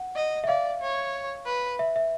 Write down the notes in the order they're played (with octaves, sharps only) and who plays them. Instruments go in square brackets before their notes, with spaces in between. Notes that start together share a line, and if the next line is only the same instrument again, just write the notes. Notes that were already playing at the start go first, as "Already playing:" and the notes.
Already playing: [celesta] F#5
[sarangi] D#5
[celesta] E5
[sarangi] D5 [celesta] F5
[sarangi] C#5
B4
[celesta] E5
E5